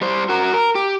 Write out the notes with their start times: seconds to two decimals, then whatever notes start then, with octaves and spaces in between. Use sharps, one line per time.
0.01 G3 C5
0.29 F#4 A#4
0.53 A#4
0.75 G4